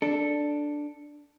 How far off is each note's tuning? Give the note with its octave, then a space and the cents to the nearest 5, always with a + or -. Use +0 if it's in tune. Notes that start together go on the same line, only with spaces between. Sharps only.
D4 +0 A4 +0